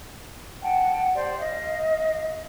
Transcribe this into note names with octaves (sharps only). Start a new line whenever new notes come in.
F#5 G5 A5
G4 C5 D5
D#5 F5